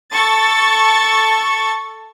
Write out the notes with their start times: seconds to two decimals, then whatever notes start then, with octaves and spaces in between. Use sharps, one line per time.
0.11 A4 C#6 A6